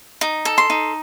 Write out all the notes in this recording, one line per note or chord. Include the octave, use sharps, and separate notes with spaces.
D#4
A4
C6
D#4